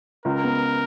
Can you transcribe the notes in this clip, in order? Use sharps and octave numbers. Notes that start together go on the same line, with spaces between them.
C#2 A#4
B3